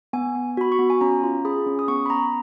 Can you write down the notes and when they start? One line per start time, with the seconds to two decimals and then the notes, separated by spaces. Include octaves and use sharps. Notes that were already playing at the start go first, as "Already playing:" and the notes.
0.13 B3 G#5
0.35 B3
0.57 F#4 B5
0.72 C#6
0.79 B3
0.90 G#5
1.01 C#4 A#5
1.23 F4
1.45 G#4 B5
1.66 C#4
1.79 D#6
1.88 B3 C#6
2.06 B5
2.10 B3 A#5